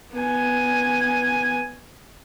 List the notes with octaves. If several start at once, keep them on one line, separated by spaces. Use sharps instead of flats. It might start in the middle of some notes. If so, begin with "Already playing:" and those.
B3 G#5